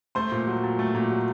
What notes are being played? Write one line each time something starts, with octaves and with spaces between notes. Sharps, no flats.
A3 C5 C6
A#2
F#3
A#2
A3
A#2
F#3